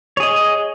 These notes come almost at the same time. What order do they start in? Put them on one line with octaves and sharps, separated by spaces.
C#5 G#4 D#5